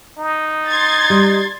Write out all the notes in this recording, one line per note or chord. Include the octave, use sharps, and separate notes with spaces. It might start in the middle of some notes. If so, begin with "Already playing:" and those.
D#4
C6 G#6 A6
G3